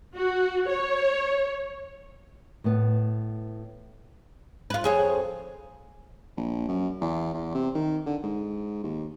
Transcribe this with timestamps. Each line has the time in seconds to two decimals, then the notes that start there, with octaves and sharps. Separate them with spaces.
0.17 F#4
0.70 C#5
2.64 A2 B3
4.70 F4 B4
4.84 F2 G#4 C#5
6.37 A#1
6.69 F#2
7.01 E2
7.34 E2
7.55 C3
7.75 D#3
8.06 D3
8.23 G#2
8.84 D#2